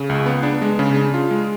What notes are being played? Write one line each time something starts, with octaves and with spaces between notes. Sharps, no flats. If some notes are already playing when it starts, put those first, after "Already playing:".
Already playing: C#3
C#2
B3
D4
G#3
C#3
D4
F4
G#3